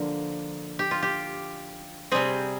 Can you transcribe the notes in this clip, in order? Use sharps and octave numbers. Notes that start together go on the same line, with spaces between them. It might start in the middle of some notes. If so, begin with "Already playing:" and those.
Already playing: D3 F3 A#3
G4
F4
G4
C3 G3 C4 G#4